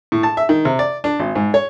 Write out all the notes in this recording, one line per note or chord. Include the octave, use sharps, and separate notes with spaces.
A2
A5
E5
D#3
C3
D5
D4
G#1
G#2
C#5